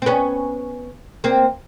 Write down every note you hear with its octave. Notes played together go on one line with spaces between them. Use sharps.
C4
B3 C#4
A#3 C4